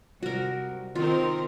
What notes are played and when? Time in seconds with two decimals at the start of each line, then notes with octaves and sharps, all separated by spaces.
0.23 C2 F#4 A#4
0.95 D#3 C4 F4 A#4